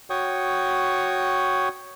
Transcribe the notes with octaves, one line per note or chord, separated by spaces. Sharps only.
F#4 C#5 G5 C#6 D#6